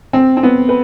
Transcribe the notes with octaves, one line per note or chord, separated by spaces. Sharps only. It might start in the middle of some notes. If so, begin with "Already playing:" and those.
C4
C4
B3
B4